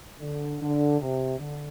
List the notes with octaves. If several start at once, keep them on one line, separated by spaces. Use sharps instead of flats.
D3
D3
C3
D3